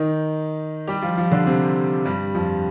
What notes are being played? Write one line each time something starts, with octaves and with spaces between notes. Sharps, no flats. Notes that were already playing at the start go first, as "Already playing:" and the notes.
Already playing: D#3 D#4
G3 G4
F3 F4
F3 F4
D3 D4
C3 C4
G2 G3
F2 F3